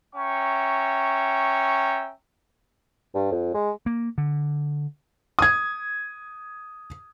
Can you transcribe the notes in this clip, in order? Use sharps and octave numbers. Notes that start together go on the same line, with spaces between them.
C#4 E5 G5 A#5 C#6
G2
F2
G#3
A#3
D3
D#6 G#6